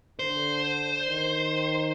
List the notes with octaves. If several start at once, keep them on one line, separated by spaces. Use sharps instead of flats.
D3 C5
D#3